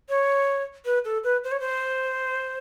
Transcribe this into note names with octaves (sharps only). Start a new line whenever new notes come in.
C#5
B4
A4
B4
C5
C#5
C5